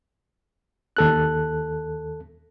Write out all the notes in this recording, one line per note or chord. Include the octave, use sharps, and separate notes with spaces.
D#2 A4 F#6